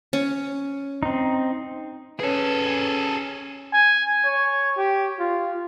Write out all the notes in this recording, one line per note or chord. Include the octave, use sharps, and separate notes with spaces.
C#4
C4 D#4
C#4 G#4 A4 B4 C#5
G#5
C#5
G4
F4